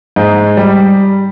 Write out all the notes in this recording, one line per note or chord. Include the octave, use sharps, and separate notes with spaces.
G#2
G3